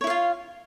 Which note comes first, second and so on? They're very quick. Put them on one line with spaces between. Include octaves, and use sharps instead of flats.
C#5 E4 F5 F4